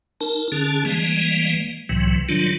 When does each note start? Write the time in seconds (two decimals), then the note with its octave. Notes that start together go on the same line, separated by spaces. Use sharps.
0.21 D#4 A#4 A5
0.52 D3 C#4 G#4 A5
0.85 E3 G3 G#3 A#3
1.89 C2 A2 C3 E3 F#3
2.29 D#3 F#3 G3 D4 F4